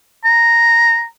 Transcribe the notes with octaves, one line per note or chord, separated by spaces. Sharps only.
A#5